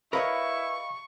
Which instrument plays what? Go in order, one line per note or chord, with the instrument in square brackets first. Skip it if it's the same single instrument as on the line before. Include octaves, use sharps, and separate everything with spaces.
[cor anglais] E4 [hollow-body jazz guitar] A#4 B4 C#5 [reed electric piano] D#5 F5 B5 [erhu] C#6